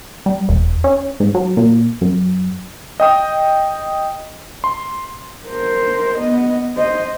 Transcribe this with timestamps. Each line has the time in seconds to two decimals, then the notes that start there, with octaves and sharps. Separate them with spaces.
0.26 G3
0.49 E1
0.84 C#4
1.20 G#2
1.35 F#3
1.57 A#2
2.01 F#2
3.00 D#5 G5 D#6
4.64 C6
5.46 A#4 C5
6.18 B3 D#5
6.76 C5 D#5